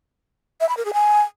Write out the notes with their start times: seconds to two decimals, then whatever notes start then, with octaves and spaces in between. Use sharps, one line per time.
0.61 E5
0.69 B5
0.77 A#4
0.85 G#4
0.94 G#5